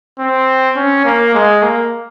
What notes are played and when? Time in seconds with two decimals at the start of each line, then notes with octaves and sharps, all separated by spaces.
0.19 C4
0.76 C#4
1.05 A#3
1.34 G#3
1.63 A#3